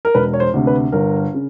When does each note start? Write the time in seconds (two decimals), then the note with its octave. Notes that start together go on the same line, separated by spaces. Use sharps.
0.05 A#4
0.14 E1 B4
0.33 C#5
0.40 C5
0.54 D2 C3
0.67 B4
0.92 G1 A#4
1.34 C#3